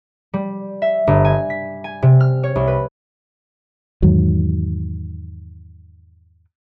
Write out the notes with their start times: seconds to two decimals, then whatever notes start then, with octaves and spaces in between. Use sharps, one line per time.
0.34 G3
0.82 E5
1.07 G1
1.25 G#5
1.50 B6
1.84 G#5
2.02 C3
2.20 F6
2.43 C#5
2.56 C2
2.67 B4
4.02 E2 G#2 D#3 F#3